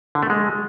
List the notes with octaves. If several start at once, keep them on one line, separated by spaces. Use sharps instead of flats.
D3
A3
G#3